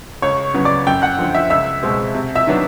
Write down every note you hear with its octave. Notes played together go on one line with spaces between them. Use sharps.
C#2 C#5 C#6
C#3 F#3 B3
D5 D6
F#2 G5 G6
F#5 F#6
D3 F3
E5 E6
C#2 E5 E6
B2 G#3 C4
C3
E5 E6
D#3 F#3 B3 D4